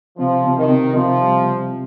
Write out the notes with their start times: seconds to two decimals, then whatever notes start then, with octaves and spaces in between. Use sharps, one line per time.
0.17 C3 F3
0.44 C3
0.57 D#3
0.69 C3
0.94 C3 F3
1.19 G3
1.45 C3
1.71 G3